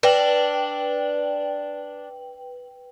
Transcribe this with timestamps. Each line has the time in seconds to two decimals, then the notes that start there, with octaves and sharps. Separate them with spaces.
0.03 D4 B4 G5 F#7